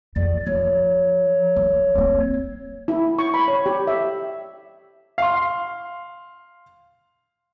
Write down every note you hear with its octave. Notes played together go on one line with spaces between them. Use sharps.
F2 D5
F3 C#5
F3
A#3 C4
E4
C#6
B5
C#5
G4
E5
F5 C6